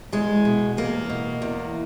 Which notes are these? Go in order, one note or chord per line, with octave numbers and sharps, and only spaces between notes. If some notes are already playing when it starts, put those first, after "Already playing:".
E2 G#3
B2
E2 A#3
B2
E2